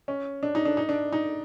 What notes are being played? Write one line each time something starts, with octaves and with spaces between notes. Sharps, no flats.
C#4
D4
D#4
D4
D#4
D4
D#4